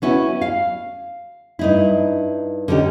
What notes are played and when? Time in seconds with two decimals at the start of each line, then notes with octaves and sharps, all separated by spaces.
0.02 B3 C#4 E4 F#4
0.41 F5
1.59 G2 D#4 E4
2.68 D3 C#4 D#4 G4